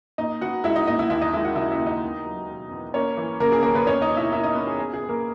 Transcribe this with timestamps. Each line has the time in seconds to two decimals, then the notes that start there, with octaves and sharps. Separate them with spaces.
0.18 A#2 D#4 D#5
0.41 B3 F#4 F#5
0.64 G#3 E4 E5
0.76 D#4 D#5
0.87 A#2 D#4 D#5
0.99 E4 E5
1.10 D#2 E4 E5
1.21 D#4 D#5
1.33 G#3 E4 E5
1.45 F#4 F#5
1.56 C#3 E4 E5
1.71 E4 E5
1.79 D#2
1.86 D#4 D#5
2.02 E2
2.26 F#3
2.48 B2
2.71 E2
2.94 A#3 C#4 C#5
3.17 E3
3.40 C#3 A#3 A#4
3.52 G#4
3.63 D#2 A#3 A#4
3.75 B3 B4
3.86 A#3 C#4 C#5
4.02 D#4 D#5
4.09 B2
4.17 E4 E5
4.32 A#3 E4 E5
4.43 D#4 D#5
4.55 B2 B3 B4
4.67 G#4
4.78 B2 G#4
4.94 G#4
5.02 B3
5.09 A#3 A#4